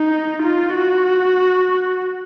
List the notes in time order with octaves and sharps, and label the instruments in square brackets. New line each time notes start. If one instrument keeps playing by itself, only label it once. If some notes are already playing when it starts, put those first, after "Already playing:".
Already playing: [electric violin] D#4
F4
F#4